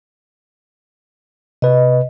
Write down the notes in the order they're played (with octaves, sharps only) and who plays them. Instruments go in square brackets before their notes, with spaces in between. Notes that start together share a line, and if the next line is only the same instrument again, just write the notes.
[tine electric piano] C3 B4 [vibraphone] D#5